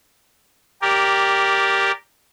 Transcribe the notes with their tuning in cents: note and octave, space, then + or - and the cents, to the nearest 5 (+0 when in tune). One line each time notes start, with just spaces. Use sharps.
G4 +0 A#4 +0 D5 -15